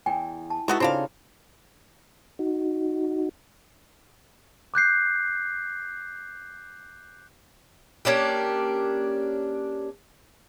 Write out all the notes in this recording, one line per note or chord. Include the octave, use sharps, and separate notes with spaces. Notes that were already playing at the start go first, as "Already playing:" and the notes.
E2 G5 G#5
A5
G#3 A3 B3 D#4 E4 F#4
C#3 C4 D4 D#4 F4 F#4 A4 F5
D#4 F#4
D6 F#6 G6 C7
A#3 C#4 D4 G4